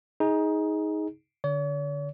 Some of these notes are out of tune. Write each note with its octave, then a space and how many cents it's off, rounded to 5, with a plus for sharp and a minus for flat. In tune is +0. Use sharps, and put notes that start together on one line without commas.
D#4 +20 G#4 +0
D3 +0 C#5 +45